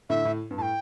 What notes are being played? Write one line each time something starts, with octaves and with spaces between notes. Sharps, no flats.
A2 D3 E5
A2
G2
A2 G5 A5